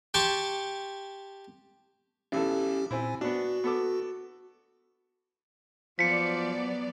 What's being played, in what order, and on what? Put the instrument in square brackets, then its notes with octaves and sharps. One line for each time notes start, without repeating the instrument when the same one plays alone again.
[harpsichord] G4 G5 A5 C6 C#6
[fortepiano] B1 E3 A4 [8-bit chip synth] C#4 G4
[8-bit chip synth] A#2 G#5 [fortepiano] C4 E4
[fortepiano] B3 D4 [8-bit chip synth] F#4
[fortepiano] B3 A4 D6
[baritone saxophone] F3 [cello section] F#3 B3 D5 [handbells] B6 C#7